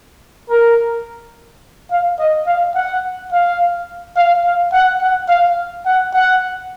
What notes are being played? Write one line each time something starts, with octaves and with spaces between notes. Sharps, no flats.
A#4
F5
D#5
F5
F#5
F5
F5
F5
F#5
F#5
F5
F#5
F#5